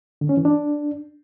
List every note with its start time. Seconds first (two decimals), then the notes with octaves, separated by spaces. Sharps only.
0.21 D3
0.29 C#4
0.37 E3
0.45 D4